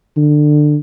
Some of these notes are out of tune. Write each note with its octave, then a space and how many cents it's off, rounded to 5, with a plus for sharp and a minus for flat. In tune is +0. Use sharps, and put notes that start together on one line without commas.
D3 +20